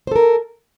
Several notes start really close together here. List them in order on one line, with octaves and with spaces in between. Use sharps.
C5 A4 A#4